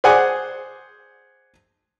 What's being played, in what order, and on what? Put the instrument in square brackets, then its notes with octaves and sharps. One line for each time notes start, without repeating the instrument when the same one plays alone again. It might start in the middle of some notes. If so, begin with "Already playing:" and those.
[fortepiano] G#4 C5 D5 F#5 G#5 D#6